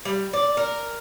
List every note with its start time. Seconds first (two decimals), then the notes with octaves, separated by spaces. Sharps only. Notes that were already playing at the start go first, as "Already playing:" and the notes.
0.05 G3
0.33 D5
0.57 A#4